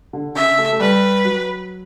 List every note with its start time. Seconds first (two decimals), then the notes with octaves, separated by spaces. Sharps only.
0.13 D3
0.35 C#3 E5
0.58 A3
0.73 A3
0.80 G3 B4
1.25 F#3